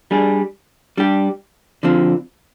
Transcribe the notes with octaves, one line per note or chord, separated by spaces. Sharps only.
G3 D4 G#4
G3 D4 G4
D3 F3 C4